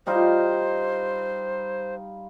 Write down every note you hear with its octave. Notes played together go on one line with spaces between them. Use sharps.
G3 D#4 F4 C5